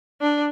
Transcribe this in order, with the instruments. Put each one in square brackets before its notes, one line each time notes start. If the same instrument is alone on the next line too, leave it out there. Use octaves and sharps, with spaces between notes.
[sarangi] D4